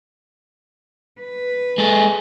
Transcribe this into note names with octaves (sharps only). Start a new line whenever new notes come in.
B4
G#3 A4 G#5